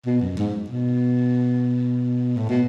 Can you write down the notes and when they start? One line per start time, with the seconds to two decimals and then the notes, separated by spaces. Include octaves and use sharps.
0.06 B2
0.22 F#2
0.38 G#2
0.70 B2
2.37 A2
2.49 B2